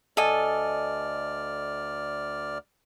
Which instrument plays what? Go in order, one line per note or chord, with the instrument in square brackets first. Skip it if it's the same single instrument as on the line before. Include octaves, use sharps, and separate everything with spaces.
[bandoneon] D2 D5 F6 [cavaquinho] A4 D#5 G#5